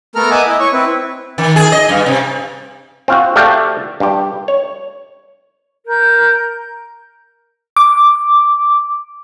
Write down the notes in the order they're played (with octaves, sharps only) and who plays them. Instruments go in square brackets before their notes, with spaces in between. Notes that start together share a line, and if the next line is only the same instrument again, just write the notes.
[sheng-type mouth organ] A3 B3 A4 A#4 A#5 F6
D#5 E5 F#5 G#5 D6 D#6
E4 D#5
C#5 C#6
C4 E4 B4
[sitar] D#3
G#4
D#5
G2
C3
[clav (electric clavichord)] C4 F4 F#4
A3 F#4 G4 D5 F5 G5
G2 G4
C#5
[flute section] A#4 G6
[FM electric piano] D6